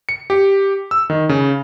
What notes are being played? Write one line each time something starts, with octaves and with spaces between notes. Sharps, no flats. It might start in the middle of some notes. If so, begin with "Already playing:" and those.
C#7
G4
E6
D#3
C#3